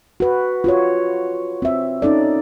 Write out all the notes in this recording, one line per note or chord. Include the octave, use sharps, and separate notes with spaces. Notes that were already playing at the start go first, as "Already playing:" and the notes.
F#4 B4
F4 F#4 C#5
C4 E5
C#4 D#4 A4 D5